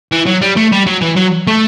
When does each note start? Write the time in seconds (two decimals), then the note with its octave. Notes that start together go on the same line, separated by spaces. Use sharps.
0.12 E3
0.26 F#3
0.41 G3
0.57 A3
0.72 G3
0.87 F#3
1.01 E3
1.17 F#3
1.47 A3